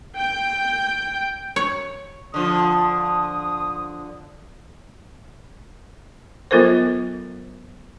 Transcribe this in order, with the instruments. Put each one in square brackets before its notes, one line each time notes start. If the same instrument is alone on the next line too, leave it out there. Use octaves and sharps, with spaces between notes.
[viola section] G5
[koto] C#5
[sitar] D3 F3 [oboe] D#6
[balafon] F#3 B3 F4 A4 A#4 C5